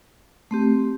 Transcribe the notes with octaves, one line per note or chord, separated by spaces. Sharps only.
A3 C4 G4